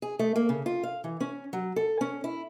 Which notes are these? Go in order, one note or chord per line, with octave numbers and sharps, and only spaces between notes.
G#4
A3
A#3
C#3
F4
F5
E3
C#4
F#3
A4
C#4
E4